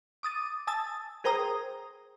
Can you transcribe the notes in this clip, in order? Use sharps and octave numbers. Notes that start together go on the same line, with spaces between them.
D6 D#6 A6 D#7
G#5 A5 D#6 E6 A6
G#4 A#4 C5 G5 A#5 D#6